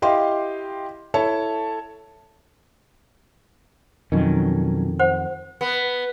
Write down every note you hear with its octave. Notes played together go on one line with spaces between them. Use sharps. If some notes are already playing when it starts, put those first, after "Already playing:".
E4 G4 D#5 F5 C6
E4 A4 C#5 A5
F2 B2 D#3 F#3 C#4
C5 F#5
B3